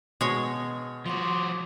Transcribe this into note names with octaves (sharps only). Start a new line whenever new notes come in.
B2 G#3 C#5
F3 F#4 C6 D6 D#6